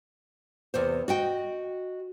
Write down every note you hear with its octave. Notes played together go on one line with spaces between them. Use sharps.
E2 C3 C5
F#4 D#5 G5